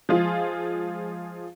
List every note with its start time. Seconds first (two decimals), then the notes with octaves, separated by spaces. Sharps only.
0.09 F3 G#3 F4 G#4